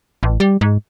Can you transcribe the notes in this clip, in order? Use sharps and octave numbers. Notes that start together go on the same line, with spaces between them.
A1
G3
G#2